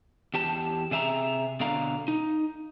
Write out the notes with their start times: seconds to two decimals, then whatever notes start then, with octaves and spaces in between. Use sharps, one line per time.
0.34 E2 G4 A5
0.91 C3 G#4 E5 A5 A#5
1.60 B2 D3 F5 A#5
2.08 D#4